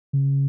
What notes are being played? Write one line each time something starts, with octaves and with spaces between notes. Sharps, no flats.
C#3